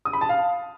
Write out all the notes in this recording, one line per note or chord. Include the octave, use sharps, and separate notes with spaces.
D#6
B5
A5
F5